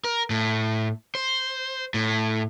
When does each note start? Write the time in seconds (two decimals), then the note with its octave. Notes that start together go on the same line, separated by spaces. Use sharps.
0.04 A#4
0.30 A2
1.15 C5
1.94 A2